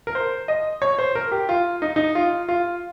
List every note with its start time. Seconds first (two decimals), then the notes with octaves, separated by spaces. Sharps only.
0.07 A#4
0.15 C5
0.48 D#5
0.82 C#5
0.99 C5
1.15 A#4
1.32 G4
1.49 F4
1.82 D#4
1.96 D#4
2.15 F4
2.48 F4